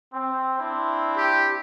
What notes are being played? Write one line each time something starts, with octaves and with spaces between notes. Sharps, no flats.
C4
C4 D4 E4
G4